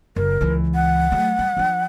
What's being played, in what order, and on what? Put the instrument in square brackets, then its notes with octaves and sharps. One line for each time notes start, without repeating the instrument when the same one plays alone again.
[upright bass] F#1 [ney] A#4
[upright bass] C#2 E3
[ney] F#5
[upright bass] F#3 A3
G3
F3 D4